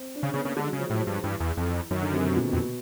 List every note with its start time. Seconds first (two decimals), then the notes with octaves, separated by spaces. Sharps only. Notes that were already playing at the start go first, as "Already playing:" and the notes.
Already playing: C4
0.15 D4
0.23 C#3 C#4
0.34 C#3 B3
0.45 C#3 A#3
0.56 D3 G#3
0.67 F#3
0.73 C#3
0.79 F3
0.90 A2 F#3
1.01 F3
1.07 G2
1.23 G2 E3
1.40 E2
1.57 F2
1.91 F#2 D#3
2.02 D3
2.14 C3
2.25 B2
2.36 A#2
2.47 B2
2.53 F2